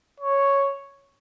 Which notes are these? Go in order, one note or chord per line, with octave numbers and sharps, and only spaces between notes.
C#5